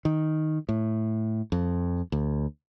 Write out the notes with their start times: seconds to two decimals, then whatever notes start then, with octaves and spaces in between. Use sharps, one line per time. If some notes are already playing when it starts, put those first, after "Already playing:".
0.05 D#3
0.69 A2
1.52 F2
2.12 D2